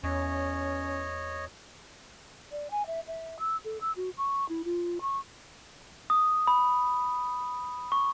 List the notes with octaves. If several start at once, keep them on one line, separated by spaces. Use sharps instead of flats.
E2 C#4 C#5 D#5
D5
G#5
E5
E5
E6
A4
E6
F#4
C#6
E4
F4
C#6
D#6
B5
C#6